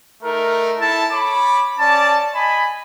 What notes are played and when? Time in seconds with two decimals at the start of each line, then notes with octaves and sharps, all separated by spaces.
0.23 A3 D#4 A#4
0.80 E4 A4 A5
1.12 C#5 B5 D6
1.79 C#4 D5 A5
2.35 D#5 G#5 B5